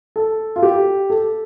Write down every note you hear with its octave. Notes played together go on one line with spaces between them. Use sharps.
A4
F4
G4
A4